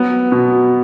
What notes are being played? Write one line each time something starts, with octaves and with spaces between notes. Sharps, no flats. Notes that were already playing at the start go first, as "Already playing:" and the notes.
Already playing: F#3 B3
B2